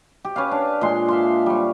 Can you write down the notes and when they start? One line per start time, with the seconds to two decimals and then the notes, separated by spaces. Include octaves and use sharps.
0.24 G4
0.36 C#4 B4 C#5 F5
0.51 D4
0.81 A#2 G#3 C6
1.08 E5 F5 C6
1.46 G3 C#5